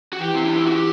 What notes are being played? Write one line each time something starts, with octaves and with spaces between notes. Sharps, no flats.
F#4
E3 G4
C4
D4
E4
F#4
G4